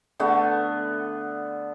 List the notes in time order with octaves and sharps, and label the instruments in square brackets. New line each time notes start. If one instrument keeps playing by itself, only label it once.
[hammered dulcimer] D3 A3 B3